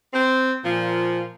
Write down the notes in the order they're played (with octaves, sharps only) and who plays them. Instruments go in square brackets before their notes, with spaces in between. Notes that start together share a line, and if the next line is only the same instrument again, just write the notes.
[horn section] C4
A#2 F3